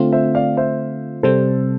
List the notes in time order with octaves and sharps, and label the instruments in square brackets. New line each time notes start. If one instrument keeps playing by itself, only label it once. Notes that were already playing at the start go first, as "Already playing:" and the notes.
Already playing: [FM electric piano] D3 A3 C4 F4
[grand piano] C5 E5
D5 F5
C5 E5
[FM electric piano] C3 G3 C4 [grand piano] A4 C5